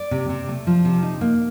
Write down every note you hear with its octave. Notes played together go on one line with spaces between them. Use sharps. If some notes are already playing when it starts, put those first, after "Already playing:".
Already playing: D5
C3
C3
A3
F3
C3
D#4
A#3